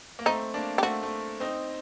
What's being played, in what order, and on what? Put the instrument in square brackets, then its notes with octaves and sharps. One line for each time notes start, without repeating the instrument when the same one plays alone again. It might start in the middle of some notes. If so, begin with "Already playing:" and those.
[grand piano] A#3
[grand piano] A3 C4 [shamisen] D#4
[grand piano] A#3 D4
[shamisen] G4
[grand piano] A3 C4 [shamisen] F#4
[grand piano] A3
C4 D#4